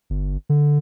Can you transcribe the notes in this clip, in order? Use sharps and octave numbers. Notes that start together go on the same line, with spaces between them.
G1
D3